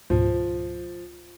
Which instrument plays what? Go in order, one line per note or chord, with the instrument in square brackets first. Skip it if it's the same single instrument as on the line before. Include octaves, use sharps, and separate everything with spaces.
[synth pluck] C#2 G#2 B2 [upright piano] F3